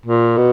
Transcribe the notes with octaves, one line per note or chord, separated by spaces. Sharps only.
A#2
B2